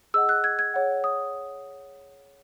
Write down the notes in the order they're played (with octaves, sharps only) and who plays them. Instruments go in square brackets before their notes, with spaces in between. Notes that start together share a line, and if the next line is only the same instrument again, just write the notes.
[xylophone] G#4 D#5 F#5 E6
F#6
G#6
G#6
G#4 C#5 F#5
D#6